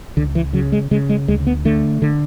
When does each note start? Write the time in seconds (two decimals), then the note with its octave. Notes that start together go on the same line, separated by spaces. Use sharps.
0.17 C#2 D3
0.35 E3
0.53 C#3 F#3
0.72 G#3
0.91 C#3 G#3
1.09 G#3
1.28 D2 G#3
1.47 B3
1.65 D3 A3
2.02 D3